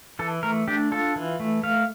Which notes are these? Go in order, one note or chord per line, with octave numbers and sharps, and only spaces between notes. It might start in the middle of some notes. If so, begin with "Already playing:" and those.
E3 A4
A3 A#4
D4 G4
F4 A4
E3
A3
A3 F5